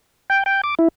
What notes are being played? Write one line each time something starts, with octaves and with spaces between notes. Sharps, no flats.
G5
G5
D6
E4